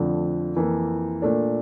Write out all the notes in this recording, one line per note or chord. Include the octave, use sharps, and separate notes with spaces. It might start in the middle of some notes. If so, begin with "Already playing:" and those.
Already playing: F2 D3 F3 A3
F2 E3 A#3
A#2 A3 D4